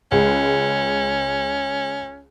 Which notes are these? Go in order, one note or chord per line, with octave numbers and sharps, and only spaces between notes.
C#2 G#3 C#4